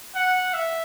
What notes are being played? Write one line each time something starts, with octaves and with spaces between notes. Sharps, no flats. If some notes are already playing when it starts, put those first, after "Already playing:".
F#5
E5